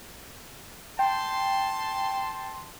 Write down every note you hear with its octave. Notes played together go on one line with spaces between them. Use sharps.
G5 A5 C6